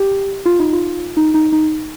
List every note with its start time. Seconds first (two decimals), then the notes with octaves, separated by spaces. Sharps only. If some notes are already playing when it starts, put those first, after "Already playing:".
Already playing: G4
0.46 F4
0.59 D#4
0.73 F4
1.17 D#4
1.34 D#4
1.52 D#4